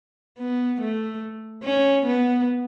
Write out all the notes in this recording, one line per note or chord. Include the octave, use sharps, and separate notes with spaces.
B3
A3
C#4
B3